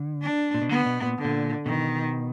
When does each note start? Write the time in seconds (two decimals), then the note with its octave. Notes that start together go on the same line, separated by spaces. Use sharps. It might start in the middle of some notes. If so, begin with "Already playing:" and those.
Already playing: D3
0.22 D4
0.54 A#2
0.62 B2
0.69 D3 B3
0.86 B2
1.02 A#2
1.18 D3
1.24 A#2
1.66 B2 D#3